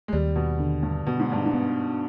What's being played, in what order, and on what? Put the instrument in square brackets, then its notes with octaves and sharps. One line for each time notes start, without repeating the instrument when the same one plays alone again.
[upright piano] G#3
[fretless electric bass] D#2 [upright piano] G3
[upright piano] B2
[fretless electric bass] D3
[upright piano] G2
[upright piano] B2 [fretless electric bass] B3
[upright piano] G#2
G2
G#2
[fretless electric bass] B3